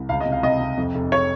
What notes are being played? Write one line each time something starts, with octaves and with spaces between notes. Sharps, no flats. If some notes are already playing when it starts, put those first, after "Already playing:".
Already playing: C2
C#2 F5
D#5
C3
F5
C3 D#5
C3
F2
F1
C#5